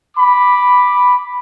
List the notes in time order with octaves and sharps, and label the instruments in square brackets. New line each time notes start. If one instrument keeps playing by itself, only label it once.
[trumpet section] B5 D6